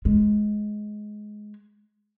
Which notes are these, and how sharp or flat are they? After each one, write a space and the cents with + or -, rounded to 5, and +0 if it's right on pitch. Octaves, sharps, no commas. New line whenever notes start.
G#3 +15